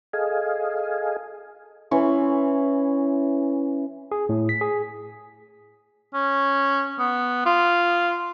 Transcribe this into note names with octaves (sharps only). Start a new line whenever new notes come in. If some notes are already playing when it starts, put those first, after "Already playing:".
G#4 A4 D#5 F5 G#5
E3 C#4 C6 C#6
G#4
A2
B6
G#4
C#4
B3
F4